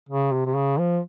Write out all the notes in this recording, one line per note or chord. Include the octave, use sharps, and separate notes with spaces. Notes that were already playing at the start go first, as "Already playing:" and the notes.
C#3
C3
C3
C#3
F3